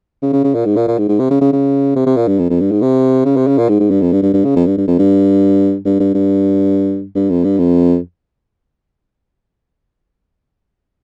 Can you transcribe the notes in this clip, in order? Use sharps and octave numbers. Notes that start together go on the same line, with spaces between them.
C#3
C#3
C#3
A#2
G#2
A#2
A#2
G#2
G#2
C3
C#3
C#3
C#3
C3
C3
A#2
G2
F2
F2
G2
G#2
C3
C#3
C3
C#3
A#2
G#2
G#2
G2
F2
G2
G2
G2
C#3
F2
G2
G2
F2
G2
G2
G2
G2
G2
F2
G2
F2